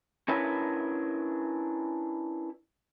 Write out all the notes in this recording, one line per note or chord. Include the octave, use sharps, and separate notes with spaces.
C#4 D4 E4 A#4 B4 C#5